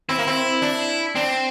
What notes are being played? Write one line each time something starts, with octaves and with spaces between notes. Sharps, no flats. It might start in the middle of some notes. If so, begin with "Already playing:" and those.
C4 E4
A#3
C4
D4
C4 D4